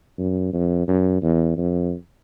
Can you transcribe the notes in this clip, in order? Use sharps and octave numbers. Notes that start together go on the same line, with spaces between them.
F#2
F2
F#2
E2
F2